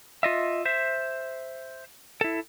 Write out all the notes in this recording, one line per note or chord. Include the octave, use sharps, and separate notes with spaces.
F4 D#5 E5
C5 E5
E4 A4